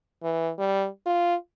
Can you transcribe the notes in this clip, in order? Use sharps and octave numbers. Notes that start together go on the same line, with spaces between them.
E3
G3
F4